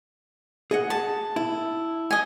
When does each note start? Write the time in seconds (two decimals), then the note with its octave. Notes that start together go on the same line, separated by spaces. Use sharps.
0.71 G#4 D#5 F#5
0.90 A5
1.36 E4
2.11 D#5 G#5